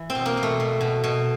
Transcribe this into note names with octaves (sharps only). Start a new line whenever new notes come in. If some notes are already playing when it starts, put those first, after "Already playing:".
Already playing: E3
C4
B2
A#3
B2
A3
B2
B2
B2